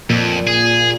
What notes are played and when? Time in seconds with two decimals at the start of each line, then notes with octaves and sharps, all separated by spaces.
0.10 F2 A#2
0.47 G#4